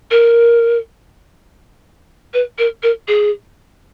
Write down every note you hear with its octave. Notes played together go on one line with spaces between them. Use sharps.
A#4
B4
A#4
A#4
G#4